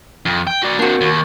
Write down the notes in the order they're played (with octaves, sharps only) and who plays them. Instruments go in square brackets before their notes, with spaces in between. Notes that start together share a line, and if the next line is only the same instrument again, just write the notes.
[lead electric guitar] F2
G5
F#4 D5
[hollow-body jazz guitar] A#3 F#4 [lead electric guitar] C4 D4
[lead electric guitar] D#2